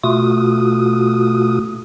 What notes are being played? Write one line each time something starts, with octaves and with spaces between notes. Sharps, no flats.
B2 A3 F4 F#4 D#6